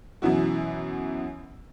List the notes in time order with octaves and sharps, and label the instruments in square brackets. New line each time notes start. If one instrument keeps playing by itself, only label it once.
[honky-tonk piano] F#2 B2 E3 E4 F#4